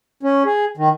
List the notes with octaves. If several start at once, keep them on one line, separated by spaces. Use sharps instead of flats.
C#4
G#4
D#3